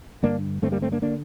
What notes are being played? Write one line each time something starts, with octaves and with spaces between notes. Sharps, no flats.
G2 D3 A#3 D4
G2 D3 A3 C4
G3 A#3
A3 C4
A#3 D4
D3 A#3 D4